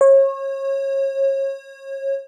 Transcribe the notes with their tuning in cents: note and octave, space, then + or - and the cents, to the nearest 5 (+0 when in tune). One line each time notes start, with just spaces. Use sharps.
C#5 -30